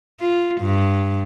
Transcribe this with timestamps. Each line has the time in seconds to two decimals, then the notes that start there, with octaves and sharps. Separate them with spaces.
0.21 F4
0.61 G2